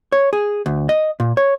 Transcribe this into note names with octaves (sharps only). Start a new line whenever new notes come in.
C#5
G#4
D2
D#5
A#2
C#5